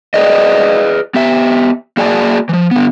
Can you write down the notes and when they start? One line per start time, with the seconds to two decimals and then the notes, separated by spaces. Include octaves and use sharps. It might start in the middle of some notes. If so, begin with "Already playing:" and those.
0.14 G#4 B4 D5 D#5
1.14 B3 G4 E5
1.97 A#3 F#4 G#4 D5 G#5 A5
2.49 E3 F3
2.71 D3 B3